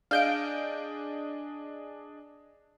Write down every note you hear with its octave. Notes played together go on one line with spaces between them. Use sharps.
D4 G#4 D#5 F5 G6 D7